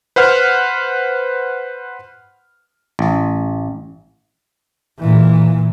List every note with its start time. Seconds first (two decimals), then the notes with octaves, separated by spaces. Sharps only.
0.16 B4 C5 F#5 F6
2.99 A1
4.99 A#2 E3